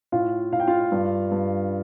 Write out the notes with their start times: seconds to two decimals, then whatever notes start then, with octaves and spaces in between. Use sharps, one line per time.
0.12 A2 F4 F5
0.52 A2 F5
0.60 G5
0.67 F4 F5
0.92 G2
1.31 G2